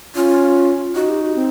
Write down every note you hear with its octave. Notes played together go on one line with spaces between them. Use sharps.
C#4 F4
D#4 F#4
G4
F#4
C4